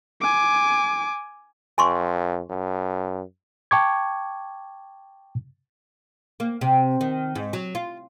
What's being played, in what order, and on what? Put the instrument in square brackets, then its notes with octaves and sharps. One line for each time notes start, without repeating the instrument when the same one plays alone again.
[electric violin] G#5 D6
[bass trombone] F2 [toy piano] G#5 C6 C#6
[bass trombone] F#2
[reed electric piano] G5 A5 C#6 D6 G#6
[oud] A#3
C3
D#3
G#2
F#3
F4